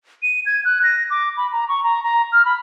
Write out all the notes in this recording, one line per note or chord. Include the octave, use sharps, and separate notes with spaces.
D#7
G#6
F#6
A#6
D6
B5
A#5
C#6
A#5
A#5
F6
B5